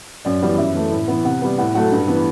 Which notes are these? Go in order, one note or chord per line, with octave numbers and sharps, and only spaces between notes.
F#2 D5
E3 G3 B3
F#2 E5
E3 A3
A2
E3 B3
C3 F#5
G3 B3
A2 F#5
F#3 A3 F#5
G2
E3 B3